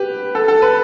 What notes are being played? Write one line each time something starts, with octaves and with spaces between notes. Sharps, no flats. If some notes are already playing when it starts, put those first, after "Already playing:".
Already playing: G4 B4
A4
A4
B4